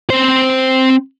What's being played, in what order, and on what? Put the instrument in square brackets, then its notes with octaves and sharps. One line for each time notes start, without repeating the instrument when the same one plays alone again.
[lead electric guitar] C4 C5